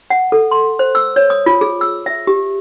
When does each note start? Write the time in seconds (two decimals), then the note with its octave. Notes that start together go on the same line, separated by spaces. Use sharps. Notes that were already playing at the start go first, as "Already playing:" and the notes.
0.10 F#5
0.32 A4
0.51 C6
0.79 C5
0.95 E6
1.16 C#5
1.30 D#6
1.46 F4
1.61 G#4
1.81 E6
2.06 E5
2.27 G4